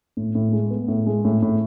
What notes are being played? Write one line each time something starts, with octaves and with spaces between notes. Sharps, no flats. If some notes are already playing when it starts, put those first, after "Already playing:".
A2
A2
G#3
B3
A2
G#3
A2
A2